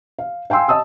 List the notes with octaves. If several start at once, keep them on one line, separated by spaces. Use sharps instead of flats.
F5
F5 G5 G#5 C6 E6
D#5 A5 D#6 E6